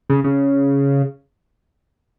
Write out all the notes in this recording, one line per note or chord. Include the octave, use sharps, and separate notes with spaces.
C#3
C#3